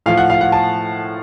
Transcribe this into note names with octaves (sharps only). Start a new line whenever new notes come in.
A2 F3 F5
F#5
F5
F#5
A5